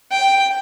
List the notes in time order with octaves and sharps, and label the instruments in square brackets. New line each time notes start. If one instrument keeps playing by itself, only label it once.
[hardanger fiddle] G5